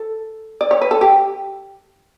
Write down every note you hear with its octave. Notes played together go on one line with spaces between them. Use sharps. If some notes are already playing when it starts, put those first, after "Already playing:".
Already playing: A4
D5
C#5
B4
A4
G4